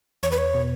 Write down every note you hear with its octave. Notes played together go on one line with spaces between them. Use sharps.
E2 C#5
B4
C#5
B2